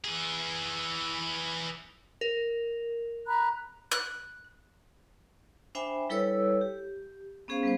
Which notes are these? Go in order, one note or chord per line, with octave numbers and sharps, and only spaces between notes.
E3 G#4
A#4
A#5 B5 F#6
F#6
D4 C5 E5 G5 G#5 B5
G3 E4 A4 B4 C#5 E6
G4
B3 C#4 G#4 C5 F5
G3 B3 C5